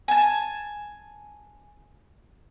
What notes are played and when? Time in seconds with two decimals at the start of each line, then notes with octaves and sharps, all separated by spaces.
0.08 G#5 A5